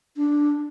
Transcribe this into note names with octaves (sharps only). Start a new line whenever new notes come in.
D4